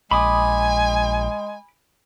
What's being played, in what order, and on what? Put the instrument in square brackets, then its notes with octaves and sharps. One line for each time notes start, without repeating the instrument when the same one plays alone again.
[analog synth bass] A#1 [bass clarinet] G#3 [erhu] G#5 [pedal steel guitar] B5 D6 D#6